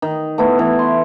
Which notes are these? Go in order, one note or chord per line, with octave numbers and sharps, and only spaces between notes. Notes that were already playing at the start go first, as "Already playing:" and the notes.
D#3
A3 B3 E4
E3
C6